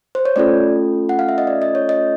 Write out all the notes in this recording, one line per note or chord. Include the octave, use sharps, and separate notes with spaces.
C5
C#5
A3 C#4 F4 A4 D5
F#5
F5
E5
D#5
D5
D#5
C#5
D#5